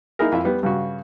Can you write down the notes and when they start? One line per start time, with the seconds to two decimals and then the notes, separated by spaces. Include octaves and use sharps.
0.19 A#3 D#4 E4 G#4 A#4
0.32 F2 E4 E5
0.45 G3 B3
0.63 G2 C#3 F#4